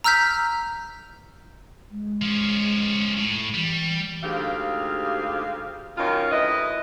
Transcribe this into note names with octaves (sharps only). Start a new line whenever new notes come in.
A#5 E6 F6 G6 B6
G#3
F3 C#4
A2
E3 G3
D2 G#2 G4 F5
F#2 D#3 F4 C#5 F5
D2 E4 B4 D#5